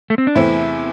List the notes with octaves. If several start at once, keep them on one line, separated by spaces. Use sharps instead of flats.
A3
C4
D4
E2 C3 E3 A3 C4 E4